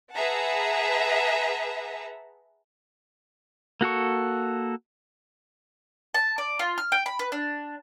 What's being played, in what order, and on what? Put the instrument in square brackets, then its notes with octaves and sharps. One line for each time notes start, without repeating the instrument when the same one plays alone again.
[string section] G#4 B4 E5 F#5 A5 A#5
[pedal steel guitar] A#3 F#4 A4 C#6
[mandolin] A5
D5
F4
F6
G5
B5
B4
D4